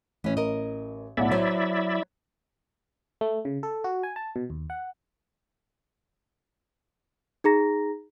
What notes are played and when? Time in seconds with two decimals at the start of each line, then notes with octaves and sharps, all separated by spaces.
0.24 A1 E3 C#4
0.37 A#4 D#5
1.17 B1 A2 E4 D5 E5 F#5
1.31 F#3 C5 C#5
3.21 A3
3.45 C#3
3.63 A4
3.84 F#4
4.03 G#5
4.16 A5
4.36 B2
4.50 D#2
4.70 F#5
7.44 D#4 G#4 A#5 A#6